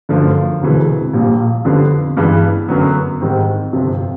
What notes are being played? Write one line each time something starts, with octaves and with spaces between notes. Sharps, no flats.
G1 F#2 D3 F3 A3
E1 D2 C3 E3 G#3
A#1 A#2 G3 A#3
F2 D3 G3 B3
G2 E3 G#3 B3
F#2 D3 F#3 B3
G#2 D#3 G3 C4
G1 F2 C3